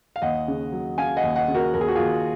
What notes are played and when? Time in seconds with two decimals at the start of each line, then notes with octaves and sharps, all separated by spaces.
0.16 F5
0.22 D#2 D#5 F#5
0.48 C#3
0.73 F#3
0.97 C#3 F5 G#5
1.17 D#5 F#5
1.23 D#2
1.36 D#5 F#5
1.48 C#3
1.55 F#4 A#4
1.74 D#2 A#4
1.81 G#4
1.88 F#4
1.95 D#2 F4 G#4